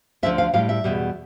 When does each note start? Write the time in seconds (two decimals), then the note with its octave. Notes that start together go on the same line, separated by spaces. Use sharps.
0.23 D2 D3 F3 E5
0.38 F5
0.54 A2 G3 F5
0.69 E5
0.84 E2 B2 G3